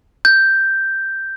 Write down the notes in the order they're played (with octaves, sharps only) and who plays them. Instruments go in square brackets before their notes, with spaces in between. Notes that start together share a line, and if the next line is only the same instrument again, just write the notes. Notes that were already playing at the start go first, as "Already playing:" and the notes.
[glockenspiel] G6